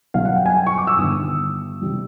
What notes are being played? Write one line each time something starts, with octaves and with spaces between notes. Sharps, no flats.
B1 B2 G3 F5
F#5
G5
G#5
G5
C#6
D6
E6
G1 G2 D#3 D#6
C3 D#3 G3